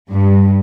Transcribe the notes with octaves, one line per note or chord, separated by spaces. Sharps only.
G2